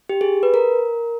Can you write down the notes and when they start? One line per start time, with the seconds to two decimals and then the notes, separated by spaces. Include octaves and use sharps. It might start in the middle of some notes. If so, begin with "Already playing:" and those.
0.09 G4
0.21 G#4
0.43 B4
0.54 A#4